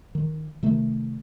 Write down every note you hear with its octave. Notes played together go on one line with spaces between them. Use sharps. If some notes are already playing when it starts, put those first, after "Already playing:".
D#3
C3 D#3 A3